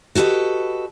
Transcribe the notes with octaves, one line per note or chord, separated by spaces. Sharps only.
F#4 G4 A4 B4 D#5